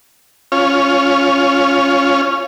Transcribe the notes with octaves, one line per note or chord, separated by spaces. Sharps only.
C#4 F4 C#5 F6